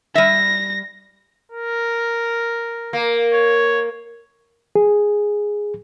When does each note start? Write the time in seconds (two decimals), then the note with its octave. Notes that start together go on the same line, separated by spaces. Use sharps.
0.15 G3 E5 A#6
1.52 A#4
2.93 A#3
3.33 C#5
4.75 G#4